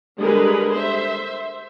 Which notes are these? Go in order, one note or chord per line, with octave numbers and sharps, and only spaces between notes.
D3 G3 G#3 G#4 A#4 B4
C5 E5